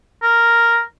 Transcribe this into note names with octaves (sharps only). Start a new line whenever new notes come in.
A#4